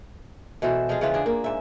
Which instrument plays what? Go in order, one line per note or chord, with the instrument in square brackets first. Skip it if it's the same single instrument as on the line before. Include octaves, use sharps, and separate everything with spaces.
[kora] B2 E3 A4 C5
F3 G#3 G#4 F5
C#3 E3 F4
D4 G#4
A#3
G#2 E5